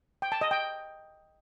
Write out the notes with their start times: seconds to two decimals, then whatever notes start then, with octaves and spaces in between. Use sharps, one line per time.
0.22 G5
0.32 A5
0.41 D#5
0.51 G5